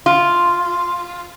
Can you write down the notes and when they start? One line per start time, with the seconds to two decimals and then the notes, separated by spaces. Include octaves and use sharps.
0.06 F4